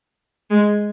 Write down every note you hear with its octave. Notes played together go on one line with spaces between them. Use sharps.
G#3